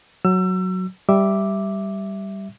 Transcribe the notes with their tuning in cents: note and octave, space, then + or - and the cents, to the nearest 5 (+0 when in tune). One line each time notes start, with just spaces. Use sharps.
F#3 +0 E6 +30
G3 +0 E5 +0 D6 +0